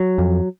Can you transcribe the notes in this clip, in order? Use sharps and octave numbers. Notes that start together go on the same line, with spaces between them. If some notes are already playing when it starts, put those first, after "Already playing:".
Already playing: F#3
F2